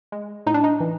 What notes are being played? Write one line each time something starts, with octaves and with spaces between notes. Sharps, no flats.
G#3
A2 D#4
D4
D#4
E3